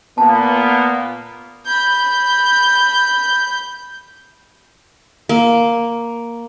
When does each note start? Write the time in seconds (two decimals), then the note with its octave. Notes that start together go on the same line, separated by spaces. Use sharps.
0.18 A#2 A#3 B3 A5
1.67 B5 G6
5.29 A#3